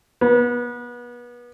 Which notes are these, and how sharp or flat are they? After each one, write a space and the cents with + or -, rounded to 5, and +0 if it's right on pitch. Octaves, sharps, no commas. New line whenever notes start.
B3 -30